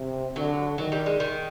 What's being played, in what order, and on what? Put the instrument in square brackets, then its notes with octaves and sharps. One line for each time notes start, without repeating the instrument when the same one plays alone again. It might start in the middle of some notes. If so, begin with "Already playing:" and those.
Already playing: [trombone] C3
[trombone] D3 [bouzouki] F#3
[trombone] D#3 [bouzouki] F#3
[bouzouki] G3
G#3
D#3